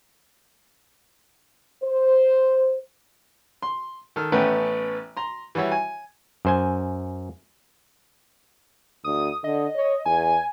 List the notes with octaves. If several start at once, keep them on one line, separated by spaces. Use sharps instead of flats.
C5
C6
D#3 A4 F6
A1 A3 B3 C#4 B4 G5
A#5 C6
E3 G3 F#4 C#5 E5
G#5
F#2 C5 G#5
D2 D#6
D3 D#5
C#5
E2 G#5